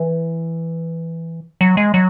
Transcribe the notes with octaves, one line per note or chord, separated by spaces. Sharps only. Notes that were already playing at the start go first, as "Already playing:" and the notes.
Already playing: E3
F#3
G#3
F#3